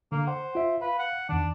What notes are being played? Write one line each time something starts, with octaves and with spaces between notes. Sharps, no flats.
D3 A#3
C5 F#5
F4 E5
B4 F5
F#5
E2 D#3 D4